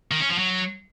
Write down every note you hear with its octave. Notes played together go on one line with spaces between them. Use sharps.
D#3
C#4
F3
F#3